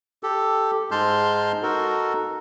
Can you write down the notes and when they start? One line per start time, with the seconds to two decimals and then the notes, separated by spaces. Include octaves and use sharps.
0.23 G4 A4
0.91 G#2 G#3 A5 C6 F6 G6
1.63 D#4 F#4 A4 A#4